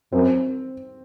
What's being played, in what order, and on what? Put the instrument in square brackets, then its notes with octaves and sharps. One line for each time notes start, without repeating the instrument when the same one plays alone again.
[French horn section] F#2 [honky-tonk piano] C4